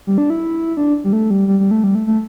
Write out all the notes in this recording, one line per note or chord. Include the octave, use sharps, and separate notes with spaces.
G3
D4
E4
D4
G3
A3
G3
G3
G3
A3
G3
A3
A3